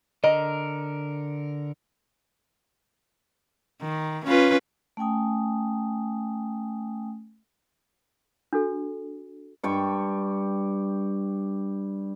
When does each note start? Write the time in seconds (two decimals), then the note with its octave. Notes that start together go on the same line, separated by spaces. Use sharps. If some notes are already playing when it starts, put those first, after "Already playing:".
0.24 D3 A#4 D#5
3.82 D#3
4.27 C#4 F4 B4
4.97 A3 C#4 G5 G#5 D#6
8.53 D4 F#4 A4
9.63 G2 G5 C#6